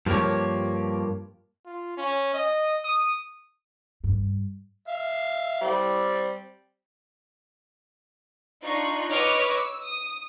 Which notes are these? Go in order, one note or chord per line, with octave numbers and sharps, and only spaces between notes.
G2 F3 A#3 G4 C#5
F4
C#4
D#5
D#6
G2
E5 F5
G3 C4
D4 D#4 F4 C#6 F#6 C7
B4 C#5 D#5 C#6 D6 F6
E6
D#6